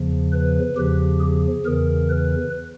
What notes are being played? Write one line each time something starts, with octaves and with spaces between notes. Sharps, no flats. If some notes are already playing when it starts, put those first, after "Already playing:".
Already playing: E2 C#3 F3
B4
E2 C#3 F3 G4
G#4
E2 C#3 E3 A#4
B4